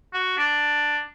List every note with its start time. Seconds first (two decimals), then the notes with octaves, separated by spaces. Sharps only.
0.13 F#4
0.37 D4